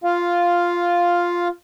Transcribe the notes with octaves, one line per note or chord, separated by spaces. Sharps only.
F4 F5